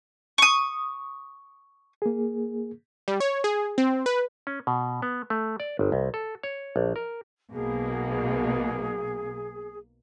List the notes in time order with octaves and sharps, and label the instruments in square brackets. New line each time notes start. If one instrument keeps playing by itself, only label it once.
[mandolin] C#6 D#6
[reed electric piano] A#3 G#4
[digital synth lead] G3
C#5
G#4
C4
B4
[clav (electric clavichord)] C#4
B2
B3
A3
D5
G1
C2
A4
C#5
A#1
A#4
[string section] B1 B2 A#3 [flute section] G#4